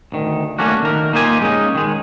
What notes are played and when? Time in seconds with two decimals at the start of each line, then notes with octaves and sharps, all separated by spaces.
0.12 D2 D#3
0.59 A3 A#3 C#4 D4 F#4
0.82 D#3 A#4
1.13 A#3 D#4 F4 G4 G#5
1.41 G#3 C#4 D#4
1.75 D#3 G#3